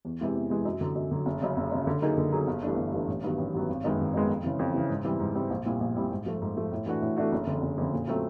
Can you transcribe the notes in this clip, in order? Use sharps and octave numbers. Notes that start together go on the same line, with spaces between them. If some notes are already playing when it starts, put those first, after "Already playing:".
E2
C3 E3 G#3
E2
C3 E3 G#3
F#2
D3 F#3
F#2
D3 F#3
F#1
F#2 C#3
F#1
F#2 C#3
D3
F#3 A#3 D#4 G#4
D3
F#3 A#3 D#4 G#4
G1
G2 E3 A3 D4
G1
G2 E3 A3 D4
A1
G2 D#3 F#3 B3
A1
G2 D#3 F#3 B3
G#1
F#2 D#3 G#3 B3
G#1
F#2 D#3 G#3 B3
F2
C#3 E3
F2
C#3 E3
G#2
E3 G3 C4
G#2
E3 G3 C4
A#1
A#2 G3 C4 E4
A#1
A#2 G3 C4 E4
G#2
F3 A3
G#2
F3 A3
A2
E3 A3 D4 F#4
A2
E3 A3 D4 F#4
F#1
F2 D3
F#1
F2 D3
A#2
F#3 A3 C4 F4